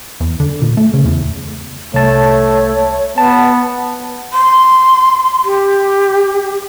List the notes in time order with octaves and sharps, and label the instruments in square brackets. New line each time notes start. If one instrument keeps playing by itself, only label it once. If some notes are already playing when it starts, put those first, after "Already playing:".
[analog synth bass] E2
D3
A#2
A3
C#3
E2
[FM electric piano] C2 A5 [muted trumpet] A3 [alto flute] C#5
[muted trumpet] B3 [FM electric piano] A5
[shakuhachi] C6
G4